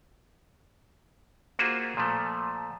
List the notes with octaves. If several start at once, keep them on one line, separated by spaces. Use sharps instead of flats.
A#3 F4 F#4 G#4 C5 E5
A#2 F3 A3